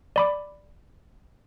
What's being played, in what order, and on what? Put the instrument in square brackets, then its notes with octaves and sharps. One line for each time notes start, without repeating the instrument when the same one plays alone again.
[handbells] D5 B5 D6